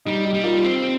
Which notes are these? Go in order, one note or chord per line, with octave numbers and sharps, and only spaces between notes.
G3 D#4
D#4 G4
G3
F4 A#4
C4